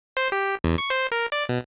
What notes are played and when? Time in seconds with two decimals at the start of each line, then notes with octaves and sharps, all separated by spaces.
0.17 C5
0.32 G4
0.64 E2
0.78 C#6
0.90 C5
1.12 A#4
1.32 D5
1.49 B2